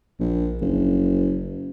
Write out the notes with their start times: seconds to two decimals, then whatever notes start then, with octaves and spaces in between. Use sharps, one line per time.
0.20 A#1
0.62 F#1